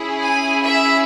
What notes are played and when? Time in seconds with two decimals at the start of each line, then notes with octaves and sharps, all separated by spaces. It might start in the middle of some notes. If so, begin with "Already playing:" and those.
Already playing: C#4 E4 G#4
0.23 G#5
0.62 E5